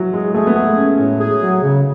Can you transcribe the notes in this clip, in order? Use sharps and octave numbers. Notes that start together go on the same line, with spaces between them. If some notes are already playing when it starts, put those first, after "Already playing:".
Already playing: E3 F#3
G#3 G#4
A3 G#4
B3
A3 G#4
C#4
A2
G#4
F#3
C#3